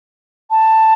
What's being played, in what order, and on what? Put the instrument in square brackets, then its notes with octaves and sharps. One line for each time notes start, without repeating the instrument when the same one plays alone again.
[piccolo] A5